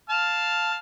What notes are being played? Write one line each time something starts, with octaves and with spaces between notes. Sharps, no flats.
F5 A5 F6